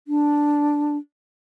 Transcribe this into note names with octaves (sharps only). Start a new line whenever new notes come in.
D4